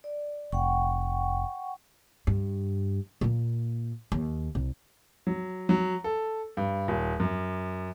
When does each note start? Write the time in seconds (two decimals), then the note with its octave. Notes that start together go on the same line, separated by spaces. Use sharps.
0.04 D5
0.52 F1 F#5 G5 C#6
2.27 G2
3.21 A#2 A#3
4.12 D#2
4.55 C2
5.27 F#3
5.69 F#3
6.04 A4
6.57 G2
6.88 D#1
7.20 F#2